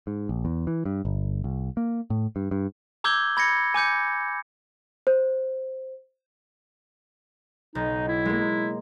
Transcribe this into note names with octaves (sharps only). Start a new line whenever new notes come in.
G#2
A#1
E2
E3
G2
G1
C2
A#3
A2
G2
G2
A#5 D6 E6 G6 G#6 G7
B5 G#6 A#6 C#7
G#5 D6 G6 C#7
C5
B1 D#4
E4
G#3 A#3